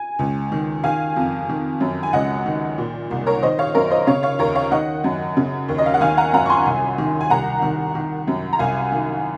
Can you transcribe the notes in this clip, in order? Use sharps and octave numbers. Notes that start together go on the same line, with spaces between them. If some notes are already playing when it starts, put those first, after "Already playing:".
Already playing: G#5
C#2
D#3
D#3 F5 G#5
F2
D#3
F#2
G#5
C#2 D#5 F#5
D#3
A#2
C2
A#4 C#5
D#3 C5 D#5
C#5 F5
F#2 A#4
C5 D#5
C#3 C#5 F5
C#5 F5
D#2 A#4 C#5
C#5 F5
D#3 D#5 F#5
F#2
C#3
D#2
D#5
F5
F#5
D#3 F5 G#5
F#5 A#5
F#2 F#5 A#5
C#6
G#5 C6
C2
D#3
G#5
C2 F#5 A#5
D#3
D#3
F#2
A#5
C2 F5 G#5
D#3